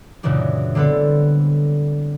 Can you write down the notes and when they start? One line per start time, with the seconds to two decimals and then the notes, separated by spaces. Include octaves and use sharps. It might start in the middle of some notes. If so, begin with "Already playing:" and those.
0.23 F#2 A#2 C#3 E3 G#3 D4
0.75 D3 G3 B3 C4 A4